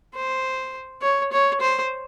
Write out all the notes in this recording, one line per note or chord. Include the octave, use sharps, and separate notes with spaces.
C5
C#5
C#5
C5